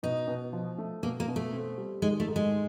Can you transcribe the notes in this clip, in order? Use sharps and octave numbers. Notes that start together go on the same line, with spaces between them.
B2 D#4
B2
F3
A3
B2 A#3
A#3
B2
A3
C4
G3
D#3 G#3
A3
G#2
G#3